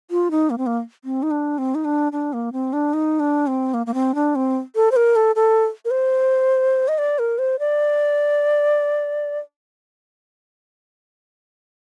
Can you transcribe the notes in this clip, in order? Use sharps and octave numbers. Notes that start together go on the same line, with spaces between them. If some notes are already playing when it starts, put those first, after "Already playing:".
F4
D#4
A#3
C4
A#3
C4
D#4
D4
C4
D#4
D4
D4
A#3
C4
D4
D#4
D4
C4
A#3
A#3
C4
D4
C4
A4
C5
A#4
A4
A4
A#4
C5
D#5
D5
A#4
C5
D5